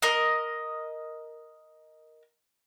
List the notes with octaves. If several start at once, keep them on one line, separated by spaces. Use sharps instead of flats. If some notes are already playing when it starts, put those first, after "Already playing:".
A#4 D#5